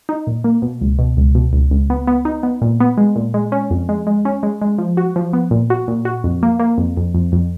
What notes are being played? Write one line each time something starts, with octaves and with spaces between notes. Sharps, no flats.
D#4
A#2
A#3
B2
C#2
B2
C#2
B2
C#2
C#2
B3
B3
D#4
B3
A#2
B3
G#3
A#2
G#3
C#4
F2
G#3
G#3
C#4
G#3
G#3
F3
F#4
F3
B3
A#2
F#4
A#2
F#4
F2
A#3
A#3
F2
F2
F2
F2